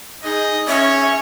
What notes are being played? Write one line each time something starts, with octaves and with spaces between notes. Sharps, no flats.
D#4 G#4 D#5
C#4 C#5 E5